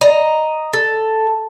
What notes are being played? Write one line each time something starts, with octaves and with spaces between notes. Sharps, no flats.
D#5 A#5
A4